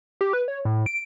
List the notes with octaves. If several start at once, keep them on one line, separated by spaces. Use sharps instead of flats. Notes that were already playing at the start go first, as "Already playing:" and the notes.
G4
B4
C#5
A2
D7